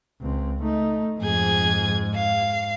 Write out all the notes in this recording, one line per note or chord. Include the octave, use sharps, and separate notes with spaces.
C#2 C4
A3 D#4
F2 G#2 G#4 G#6
F5